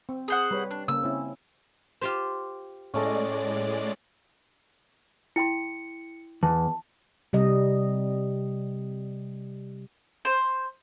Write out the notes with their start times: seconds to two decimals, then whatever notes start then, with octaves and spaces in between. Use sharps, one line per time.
0.09 C4
0.28 G#4 C5 F#5
0.51 G3 B4 C#5
0.71 D4
0.88 C#3 A#3 E6
1.03 C4 C#4 E4
2.01 F4 G4 C5
2.94 A2 G#3 C#4 A4 D5 D#5
5.36 E4 G5 C6 C#7
6.43 E2 A5
7.33 C3 G3 D#5
10.25 C5